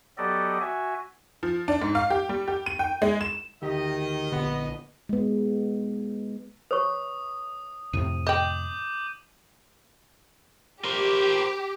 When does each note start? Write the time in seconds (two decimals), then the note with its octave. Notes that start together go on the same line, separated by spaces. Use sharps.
0.18 F#3 B3 G4 A4 D5 D#5
0.61 F#4 E5 G#5
1.43 F3
1.68 D4
1.82 G#2
1.95 F5
2.10 G4
2.29 G3
2.48 G4
2.66 D#7
2.79 G5
3.02 G#3
3.21 E7
3.62 D2 D#3 G4 D#5
4.32 A#1 D3 B3
5.09 G#3 B3
6.71 B4 C#5 C#6 D#6
7.93 F2 A2 C3 D#7
8.27 D#5 G5 D6 G6 F#7
10.84 G4 A#4 C5